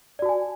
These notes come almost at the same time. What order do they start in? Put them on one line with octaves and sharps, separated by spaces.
D5 F#4 A5 G#5